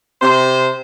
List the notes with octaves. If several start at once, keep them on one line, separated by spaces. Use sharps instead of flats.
C3 C5